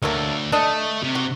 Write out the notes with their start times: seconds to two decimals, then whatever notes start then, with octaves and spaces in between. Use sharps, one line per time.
0.02 D2 F#3 A3 A#3
0.52 A3 D4 D#5
1.03 C3
1.15 F#4